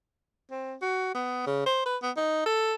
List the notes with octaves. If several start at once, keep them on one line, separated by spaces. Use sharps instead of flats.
C4
F#4
B3
C#3
C5
B4
B3
D#4
A4